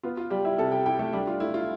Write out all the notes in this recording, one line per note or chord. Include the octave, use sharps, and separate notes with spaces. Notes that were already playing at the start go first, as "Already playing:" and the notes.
B3 F4
F4
G3 G4
E4 E5
C3 A4 A5
G4 G5
E4 G4 G5
A3 A4
G3 D4 G4
F4
A3 E4
F4